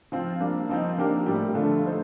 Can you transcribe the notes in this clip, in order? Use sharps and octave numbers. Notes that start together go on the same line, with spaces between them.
F3 C4 F4
G3 A#3 D4
F3 C4 D#4
F3 A#3 D4 G4 A#4
A2 G3 C4 G4
D3 F3 A3 D4 F4
A3 D#4 A4 C5